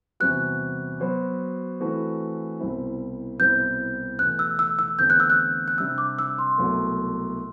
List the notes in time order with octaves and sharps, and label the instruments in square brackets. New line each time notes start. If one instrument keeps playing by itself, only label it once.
[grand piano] E2 C3 G3 C4 F#4 [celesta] F#6
[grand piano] F#3 B3 F#4 C5
E3 A3 C4 F#4 B4
C2 B2 G3 C4 E4
[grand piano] C2 B2 G3 C4 E4 [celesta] G6
[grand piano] E2 B2 A3 [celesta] F#6
[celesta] E6
E6
E6
[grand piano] E2 D3 A3 C4 [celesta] G6
[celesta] F#6
E6
F#6
F#6
[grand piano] C3 G3 D4 G4 [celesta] E6
[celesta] D6
E6
C6
[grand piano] C2 B2 F#3 A3